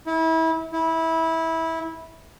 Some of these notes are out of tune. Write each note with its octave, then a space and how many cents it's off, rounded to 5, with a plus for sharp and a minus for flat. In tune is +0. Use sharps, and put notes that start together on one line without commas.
E4 -30
E4 -20